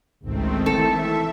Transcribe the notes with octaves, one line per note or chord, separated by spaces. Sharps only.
G#1 C#2 D#3 A3 C4
E3 A4 E5